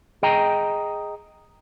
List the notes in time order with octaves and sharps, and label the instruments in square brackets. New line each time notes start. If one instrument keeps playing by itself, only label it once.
[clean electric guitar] G#4 D#5 G5 A#5